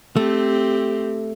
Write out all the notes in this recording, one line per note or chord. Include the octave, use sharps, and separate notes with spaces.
A3 C4 G4